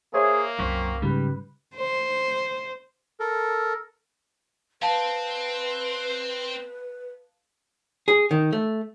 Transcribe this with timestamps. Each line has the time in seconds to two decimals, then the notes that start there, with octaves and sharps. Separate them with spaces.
0.14 A#3 G#4 C5 C#5 E5
0.59 C2 F#2 C4 C#6 B6
1.02 G#2 C#3 G3 B4
1.75 C5
3.20 A4 A#4
4.82 C4 B4 F5 A5
8.08 G#4
8.31 D#3
8.53 A3